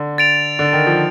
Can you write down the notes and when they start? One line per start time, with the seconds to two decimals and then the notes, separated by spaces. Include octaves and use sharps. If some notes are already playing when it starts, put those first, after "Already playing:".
Already playing: D3
0.18 A6 D7 F7
0.59 D3
0.73 D#3
0.87 F3